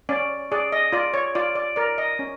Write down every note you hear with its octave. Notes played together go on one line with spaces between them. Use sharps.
C#4 D5
G#4 D5
D#5
F4 D5
C#5
F4 D5
D5
A#4 D5
D#5
C#4